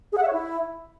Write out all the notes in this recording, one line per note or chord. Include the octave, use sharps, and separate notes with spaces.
G#4
F#5
E5
C#5
E4